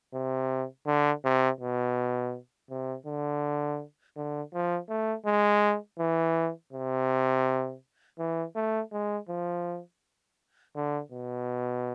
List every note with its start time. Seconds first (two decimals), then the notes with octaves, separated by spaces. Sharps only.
0.14 C3
0.87 D3
1.24 C3
1.60 B2
2.70 C3
3.06 D3
4.16 D3
4.54 F3
4.89 A3
5.26 G#3
5.99 E3
6.73 C3
8.19 E3
8.55 A3
8.92 G#3
9.29 F3
10.76 D3
11.12 B2